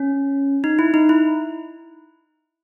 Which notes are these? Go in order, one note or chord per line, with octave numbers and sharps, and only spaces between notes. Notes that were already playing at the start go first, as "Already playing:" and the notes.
Already playing: C#4
D#4
E4
D#4
E4